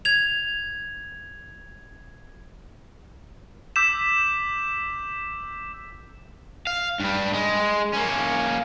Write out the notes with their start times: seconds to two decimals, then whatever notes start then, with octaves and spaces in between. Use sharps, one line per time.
0.05 G#6 F7
3.76 D6 E6 G6 B6 E7
6.67 F5
7.00 G2 G3
7.33 G#3
7.93 A#3 C#4